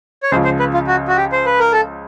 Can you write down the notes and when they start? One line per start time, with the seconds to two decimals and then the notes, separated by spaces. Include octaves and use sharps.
0.23 C#5
0.31 C#2 C#3 F3 C5
0.45 C5
0.59 B4
0.74 F4
0.87 F#4
1.08 F#4
1.16 G4
1.32 C5
1.46 B4
1.59 A#4
1.72 A4